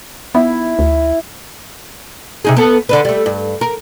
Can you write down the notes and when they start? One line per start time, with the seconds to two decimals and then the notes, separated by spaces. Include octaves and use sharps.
0.35 B3 E4
0.79 D2
2.45 C3 D#4 G#4
2.57 B3 A4
2.89 D3 D4 B4
3.05 G3 A3
3.26 G2
3.61 A#4